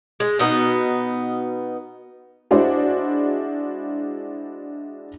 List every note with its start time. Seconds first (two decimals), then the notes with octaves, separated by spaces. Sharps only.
0.20 G#3
0.39 B2 B3 D#4
2.51 G#3 D4 E4 F#4 C5